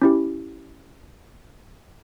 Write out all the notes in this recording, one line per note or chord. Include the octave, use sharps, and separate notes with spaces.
C#4 E4 G4